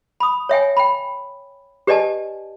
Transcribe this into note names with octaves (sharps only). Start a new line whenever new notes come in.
B5 D#6
C#5 E5 G5 G#5
G5 B5
G4 B4 D5 D#5 G#5 A5